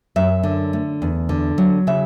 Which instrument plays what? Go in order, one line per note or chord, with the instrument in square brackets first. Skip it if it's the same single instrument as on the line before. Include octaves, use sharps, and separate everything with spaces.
[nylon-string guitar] F#2 E5
D3
A3
E2
D3
F#3
C#3 E5